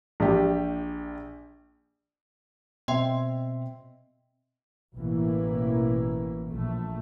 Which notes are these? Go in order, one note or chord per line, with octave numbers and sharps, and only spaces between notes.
A#1 G4
B2 C4 D#5 E5 G5 C6
A1 B2 E3 A#3
A#1 A3